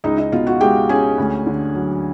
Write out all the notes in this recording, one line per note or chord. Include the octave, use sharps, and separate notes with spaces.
C#2 D#4 D#5
D#4 D#5
B2 F4 F5
F#4 F#5
G#3 G4 G5
C#4 G#4 G#5
D2
D3
F#3